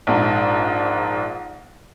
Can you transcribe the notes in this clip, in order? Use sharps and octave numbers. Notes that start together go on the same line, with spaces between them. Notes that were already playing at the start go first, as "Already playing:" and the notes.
A#1 G#2